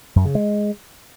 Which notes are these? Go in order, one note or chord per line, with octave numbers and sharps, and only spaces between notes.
F#2
C#3
G#3